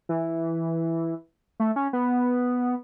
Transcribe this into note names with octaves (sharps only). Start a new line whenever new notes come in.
E3
A3
C#4
B3